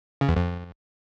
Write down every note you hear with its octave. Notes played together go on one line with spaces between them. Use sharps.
C#3
E2
F2